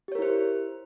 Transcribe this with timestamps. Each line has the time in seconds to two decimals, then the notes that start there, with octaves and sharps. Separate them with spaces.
0.08 G4
0.12 C#5
0.15 A#4
0.19 E4
0.22 C5